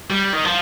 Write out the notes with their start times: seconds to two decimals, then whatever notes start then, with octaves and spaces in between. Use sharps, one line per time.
0.10 G3
0.33 D#3
0.44 F3